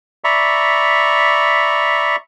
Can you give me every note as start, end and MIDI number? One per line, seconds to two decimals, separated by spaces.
0.24 2.16 74
0.24 2.16 76
0.24 2.16 82
0.24 2.16 83
0.24 2.16 85